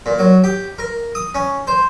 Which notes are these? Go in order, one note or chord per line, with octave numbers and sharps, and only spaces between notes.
A#2
F#3
G4
A#4
D#6
C#4
C5